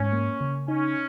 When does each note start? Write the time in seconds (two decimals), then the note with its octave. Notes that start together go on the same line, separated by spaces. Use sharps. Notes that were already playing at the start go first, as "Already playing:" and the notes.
Already playing: G#2 C#4
0.12 A#3
0.41 C#3
0.68 C#4 D#4